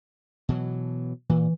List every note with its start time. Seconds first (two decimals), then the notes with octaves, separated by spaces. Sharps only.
0.49 B2 E3 F#3
1.30 A#2 E3